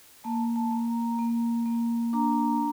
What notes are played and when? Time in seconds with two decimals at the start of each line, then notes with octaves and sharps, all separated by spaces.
0.24 A#3 A5
0.56 A5
0.71 A#3
0.88 A#5
1.19 A#3
1.66 A#3
2.13 D4 A#5